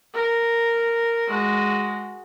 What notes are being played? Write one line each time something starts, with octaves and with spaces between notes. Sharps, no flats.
A#4
G#3 F#4